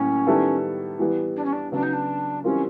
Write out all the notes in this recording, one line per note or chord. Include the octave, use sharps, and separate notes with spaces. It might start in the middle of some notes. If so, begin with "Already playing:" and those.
Already playing: A2 F#3 A#3 C#4
D#3 G3 B3 E4 A4
E3 G3 B3
D4
C#4
D4
C#3 F#3 B3 D4
D#4
D4
E3 G3 C4 C#4 F4 A#4